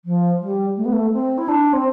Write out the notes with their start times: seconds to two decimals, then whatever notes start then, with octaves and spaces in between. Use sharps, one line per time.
0.05 F3
0.41 G3
0.77 A3
0.85 B3
0.93 A3
1.13 C4
1.38 E4
1.49 D4
1.73 C4